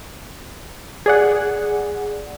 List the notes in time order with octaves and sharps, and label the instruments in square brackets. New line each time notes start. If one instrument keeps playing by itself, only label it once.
[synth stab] G#4 D5 F#5